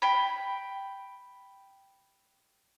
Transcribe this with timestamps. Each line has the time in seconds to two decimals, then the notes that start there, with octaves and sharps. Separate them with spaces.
0.02 G5 B5